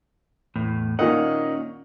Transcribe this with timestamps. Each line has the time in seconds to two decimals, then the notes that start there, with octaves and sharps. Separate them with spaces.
0.56 E2 A2
0.99 A#2 D#3 C#4 D#4 F#5